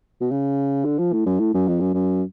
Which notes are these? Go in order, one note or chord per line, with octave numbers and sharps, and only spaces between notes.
B2
C#3
D3
F3
A2
F#2
A2
F#2
F2
F#2
F#2